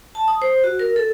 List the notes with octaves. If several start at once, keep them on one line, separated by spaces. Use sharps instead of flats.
A5
D#6
C5
F#4
A#4
A4